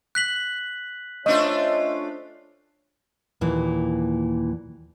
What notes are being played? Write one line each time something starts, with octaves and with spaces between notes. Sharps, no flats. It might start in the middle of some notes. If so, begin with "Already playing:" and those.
F#6 B6 F#7
A3 C#4 D4 F4 C5 C#5 D#5
D#2 A#2 E3